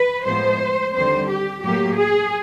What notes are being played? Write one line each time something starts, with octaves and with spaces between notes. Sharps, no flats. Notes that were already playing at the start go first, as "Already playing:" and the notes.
Already playing: B4
A2 F3 G#3 B3 C5
D#2 D3 G3 C4 C5
G4
A2 F#3 A#3 G4
G#4